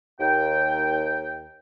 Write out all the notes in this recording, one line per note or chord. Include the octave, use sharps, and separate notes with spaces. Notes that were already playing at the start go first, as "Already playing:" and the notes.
D#2 G5